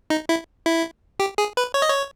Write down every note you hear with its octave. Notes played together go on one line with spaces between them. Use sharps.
D#4
E4
E4
G4
G#4
B4
C#5
D#5
C#5